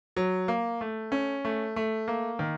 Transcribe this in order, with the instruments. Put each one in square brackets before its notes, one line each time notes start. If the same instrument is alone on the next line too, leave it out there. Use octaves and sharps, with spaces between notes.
[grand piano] F#3
A#3
A3
C#4
A3
A3
A#3
D#3